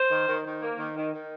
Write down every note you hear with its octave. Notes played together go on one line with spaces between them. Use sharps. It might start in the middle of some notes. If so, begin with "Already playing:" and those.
Already playing: C5
D#3
D#3
D#3
A#3
D#3
D#3
D#3